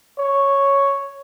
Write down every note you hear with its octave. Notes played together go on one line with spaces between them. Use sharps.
C#5